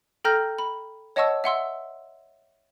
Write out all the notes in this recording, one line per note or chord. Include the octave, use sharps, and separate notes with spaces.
A4 G5 A#5 F6 G6 A#6
B5
C#5 D#5 F#5 A5 C#6 E6
E5 F#5 C6 E6